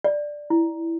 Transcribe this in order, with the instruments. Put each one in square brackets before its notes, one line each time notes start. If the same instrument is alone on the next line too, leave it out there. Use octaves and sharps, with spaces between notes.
[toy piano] D5
E4